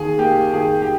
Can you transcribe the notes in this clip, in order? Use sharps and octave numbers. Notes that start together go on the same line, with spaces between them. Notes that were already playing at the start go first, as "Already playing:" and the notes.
Already playing: D#2 G#4
A#3 G4
D#2 G#4
G4